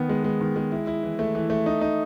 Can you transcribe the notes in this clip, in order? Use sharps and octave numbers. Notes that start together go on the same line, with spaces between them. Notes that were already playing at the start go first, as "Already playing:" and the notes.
Already playing: D#3 B3
G#3
G#3
D#3
G#3
E4
E4
E3
A3
E3
A3
D#4
D#4